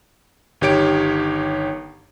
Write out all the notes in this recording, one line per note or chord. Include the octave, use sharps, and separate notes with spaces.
G1 D#3 G4 C#5 D7